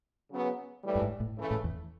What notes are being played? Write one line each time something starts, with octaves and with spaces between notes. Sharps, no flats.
C#3 F#3 B3
A2 E3 G3
G2
G#2
A2
C#3 E3 A3
A2
E2